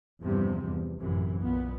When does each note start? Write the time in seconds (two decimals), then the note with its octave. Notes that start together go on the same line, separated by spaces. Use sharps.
0.22 E2 G2 C3 F3 G3
0.65 E2
1.01 A1 F#2 C3 E3
1.41 B1 A#2 B3